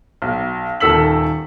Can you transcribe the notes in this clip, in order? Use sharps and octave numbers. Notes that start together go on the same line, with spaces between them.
B1
D#1 D#3 A4 E6 B6 F#7